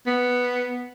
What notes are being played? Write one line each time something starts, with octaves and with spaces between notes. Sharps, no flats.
B3